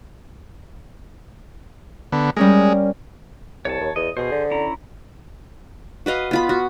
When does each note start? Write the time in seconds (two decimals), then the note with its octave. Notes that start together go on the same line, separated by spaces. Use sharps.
2.12 D3 B3
2.37 G3 G#3 C#4 A#4
3.65 C2 C#5 A5
3.80 D#2
3.96 E2 D#5
4.17 B2 G#4 C5
4.31 D3
4.51 C#4 E4 A#5
6.06 F#4 B4 D#5 F5
6.31 B3 F4 B5
6.49 F#4